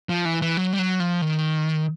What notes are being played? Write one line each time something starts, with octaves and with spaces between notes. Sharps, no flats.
F3
E3
E3
F#3
G3
F#3
F3
D#3